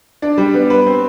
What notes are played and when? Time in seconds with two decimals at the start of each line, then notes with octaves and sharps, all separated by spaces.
0.22 D4
0.38 G3
0.54 B3
0.70 B4
0.86 C4